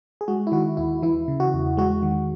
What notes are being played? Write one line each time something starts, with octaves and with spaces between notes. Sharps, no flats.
G#4
G#3 F#4
E4
D#3 F#4
D#2 E4
E3 E4
C#3
F#4
E2
G#3 F#4
D#3